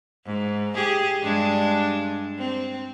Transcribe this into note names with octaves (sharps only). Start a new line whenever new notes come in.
G#2
G4 G#4
G2 G#3 D4
C4